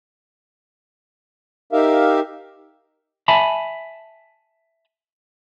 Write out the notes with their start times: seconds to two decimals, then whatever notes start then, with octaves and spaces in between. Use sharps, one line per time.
1.73 D#4 G4 A#4 E5 F5
3.28 E5 G#5 A5 B5